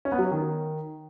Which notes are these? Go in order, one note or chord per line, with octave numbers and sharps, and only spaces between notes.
C#4
B3
F#3
C#4
D#3